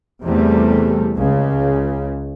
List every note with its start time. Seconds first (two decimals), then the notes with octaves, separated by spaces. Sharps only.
0.24 E2 C3 G3 A3
1.16 C#2 C#3